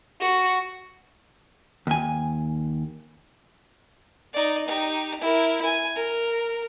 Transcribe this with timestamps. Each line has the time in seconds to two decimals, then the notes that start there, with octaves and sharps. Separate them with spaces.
0.21 F#4
1.87 D#2 G#5
4.34 D#4 D5
4.68 D#4 G4
5.21 E4 A#4
5.65 G#5
5.96 A#4